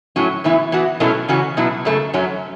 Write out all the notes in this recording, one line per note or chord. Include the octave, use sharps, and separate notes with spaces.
A2 F#3 C#4
A2 E3 B3 E4
E3 B3 F#4
B2 F#3 A3 C#4 E4
C#3 E3 C#4 F#4
B2 F#3 B3 E4
F#2 C#3 A3
F#2 F#3 C#4